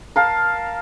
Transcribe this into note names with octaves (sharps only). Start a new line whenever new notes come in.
A#4 F5 A5